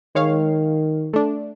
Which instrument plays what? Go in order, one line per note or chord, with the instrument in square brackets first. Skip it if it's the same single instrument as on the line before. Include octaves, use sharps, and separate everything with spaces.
[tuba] D#3 [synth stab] G#3 C#5 F5
[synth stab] A3 D4